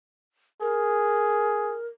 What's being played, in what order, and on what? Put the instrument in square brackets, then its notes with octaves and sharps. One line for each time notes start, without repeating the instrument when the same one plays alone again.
[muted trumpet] G#4 [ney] A#4